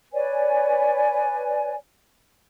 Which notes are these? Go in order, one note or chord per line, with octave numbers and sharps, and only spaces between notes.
B4 C#5 D5 G#5